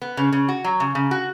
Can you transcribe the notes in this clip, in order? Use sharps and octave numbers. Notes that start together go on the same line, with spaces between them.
B3
C#3
C#3
F#4
F#3
C#3
C#3
F#4